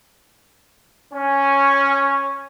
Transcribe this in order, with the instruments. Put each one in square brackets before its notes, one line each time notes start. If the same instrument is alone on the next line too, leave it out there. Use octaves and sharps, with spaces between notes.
[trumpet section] C#4